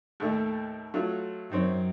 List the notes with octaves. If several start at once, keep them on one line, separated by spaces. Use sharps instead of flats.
D#2 A2 A3
F#3 A3 F4
F#2 D#3 C4 C#5